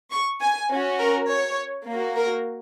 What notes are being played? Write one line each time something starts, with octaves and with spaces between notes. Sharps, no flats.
C#6
G#5
C#4 F#4
A#4
C#5
A#3 F#4
A#4